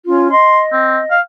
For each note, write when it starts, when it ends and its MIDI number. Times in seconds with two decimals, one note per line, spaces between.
0.06 0.31 61
0.06 0.31 65
0.32 1.15 75
0.32 0.61 84
0.73 1.00 60
1.11 1.20 77